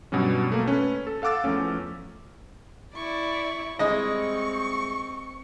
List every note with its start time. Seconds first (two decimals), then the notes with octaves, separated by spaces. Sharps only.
0.12 G2 B2 F#3 G3 C#4
0.49 B2 A3 A#3
0.66 A3 C#4 B4
1.07 A4
1.22 A4 F5 F#5 D6 E6 A6
1.44 E2 F3 A3 C#4
2.95 E4 D5 C#6
3.79 G3 G#3 C4 E4 D#5 C#6